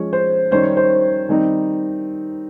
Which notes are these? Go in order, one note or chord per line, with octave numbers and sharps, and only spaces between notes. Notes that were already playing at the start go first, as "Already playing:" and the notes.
Already playing: F3 G#3 C#4 C#5
C5
D#3 G3 C#4 C5
C#5
C5
D#3 G3 C4 D#4